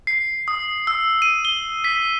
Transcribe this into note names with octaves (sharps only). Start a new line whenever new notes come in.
C7
D#6
E6
D#7
G7
B6